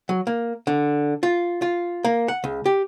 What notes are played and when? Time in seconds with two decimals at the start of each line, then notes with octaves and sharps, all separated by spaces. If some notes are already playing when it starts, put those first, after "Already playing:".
0.09 F#3
0.27 A#3
0.67 D3
1.23 F4
1.62 F4
2.04 A#3
2.28 F#5
2.44 C#2
2.66 G4